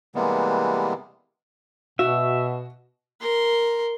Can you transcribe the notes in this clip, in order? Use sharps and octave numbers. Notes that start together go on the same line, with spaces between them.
C3 E3 G3 G#3 A#3 B3
B2 F#4 E5
A#4 C6